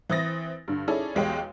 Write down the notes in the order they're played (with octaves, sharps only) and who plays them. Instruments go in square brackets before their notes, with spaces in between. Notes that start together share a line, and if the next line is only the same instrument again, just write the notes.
[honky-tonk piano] E3 C4 E4 D#6 A6 A#6
G2 D3
C#4 D#4 E4 G#4 A4 D5
B1 E2 G#3 G4 C#5 G5